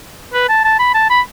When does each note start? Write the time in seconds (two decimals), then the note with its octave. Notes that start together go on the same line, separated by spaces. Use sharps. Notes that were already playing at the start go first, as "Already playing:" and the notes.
0.33 B4
0.49 A5
0.64 A5
0.79 B5
0.94 A5
1.10 B5